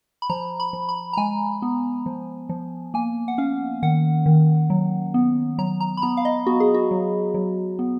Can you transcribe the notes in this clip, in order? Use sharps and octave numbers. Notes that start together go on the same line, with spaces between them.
B5
F3 A#5
B5
F3
B5
A#5
G#3 G#5
B3
F3
F3
A#3 G#5
F#5
C#4 F5
D#3 F#5
D#3
F#3
B3
F#3 A#5
A#5
B5
B3 A#5
F5
D#5
B3 F#4
G#4
F#4
F#3
F#3
B3